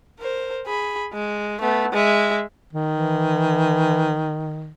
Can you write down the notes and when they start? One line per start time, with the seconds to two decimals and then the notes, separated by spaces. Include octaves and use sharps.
0.19 A#4 C5
0.67 G#4 B5
1.13 G#3
1.61 A3 B3
1.93 G#3 E5
2.73 D#3
2.92 E3